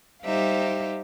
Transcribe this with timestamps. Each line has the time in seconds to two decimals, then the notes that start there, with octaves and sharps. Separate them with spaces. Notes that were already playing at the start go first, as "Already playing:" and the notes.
0.25 G3 D#4 G4 C5 E5 F5